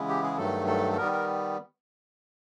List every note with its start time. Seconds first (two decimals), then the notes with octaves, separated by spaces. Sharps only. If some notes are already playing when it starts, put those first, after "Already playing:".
Already playing: C#3 E3 G#3 B3 E4
0.08 G4
0.23 G#4
0.37 G2 D#3 F#3 A3 A4
0.67 A4
0.92 A4
0.97 D#3 G3 B3 A#4
1.12 A#4